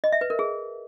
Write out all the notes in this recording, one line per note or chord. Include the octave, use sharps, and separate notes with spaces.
D#5
E5
B4
A#4
G#4